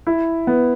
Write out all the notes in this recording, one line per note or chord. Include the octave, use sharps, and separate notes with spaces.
E4
B3